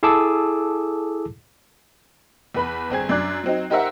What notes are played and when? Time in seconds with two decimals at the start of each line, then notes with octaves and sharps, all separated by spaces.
0.03 E4 G#4 A4 A5 D6 E6
2.55 E2 B4 B5
2.90 G1 C4 G#4 G#6
3.09 F#2 D4 D5 F#6
3.44 F#3 C4 D#4
3.70 D#4 G4 A#4 C5 E5 F#5